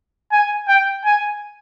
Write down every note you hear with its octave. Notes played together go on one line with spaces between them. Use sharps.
G#5
G5
G#5